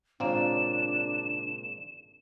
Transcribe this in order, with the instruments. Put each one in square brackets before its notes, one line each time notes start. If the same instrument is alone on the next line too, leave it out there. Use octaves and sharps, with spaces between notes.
[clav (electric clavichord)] G#1 A#3 C4 [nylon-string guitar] A#2 C#3 [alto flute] D4 [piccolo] E7